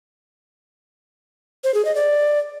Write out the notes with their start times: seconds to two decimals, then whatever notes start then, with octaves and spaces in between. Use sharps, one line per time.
1.64 C5
1.74 G#4
1.85 D#5
1.95 D5